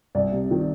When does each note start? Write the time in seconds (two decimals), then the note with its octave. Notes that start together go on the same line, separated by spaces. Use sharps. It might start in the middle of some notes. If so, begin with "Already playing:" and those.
0.15 C2 D5
0.32 C3
0.51 D#3